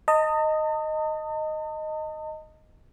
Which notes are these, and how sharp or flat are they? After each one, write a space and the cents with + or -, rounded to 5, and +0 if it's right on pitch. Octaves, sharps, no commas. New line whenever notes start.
D#5 +0 A5 +45